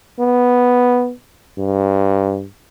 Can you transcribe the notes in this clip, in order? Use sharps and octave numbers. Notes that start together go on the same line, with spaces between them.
B3
G2